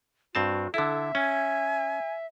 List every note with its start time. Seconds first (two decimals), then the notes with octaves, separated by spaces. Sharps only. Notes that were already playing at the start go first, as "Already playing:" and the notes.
0.35 G2 C4 F#4 A5
0.74 D3 E4 A4 E5
1.15 C#4 G#5